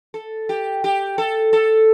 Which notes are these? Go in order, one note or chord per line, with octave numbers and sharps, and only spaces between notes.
A4
G4
G4
A4
A4